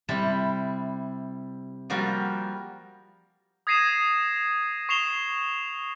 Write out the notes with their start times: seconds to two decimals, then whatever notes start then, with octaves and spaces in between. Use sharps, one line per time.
0.09 C3 G3 E4 A5 B5
1.90 F3 G3 A#3 F#4 A#4
3.67 D#6 G#6 A#6 C7 D#7 E7
4.89 C#6 C7 E7 F7 G7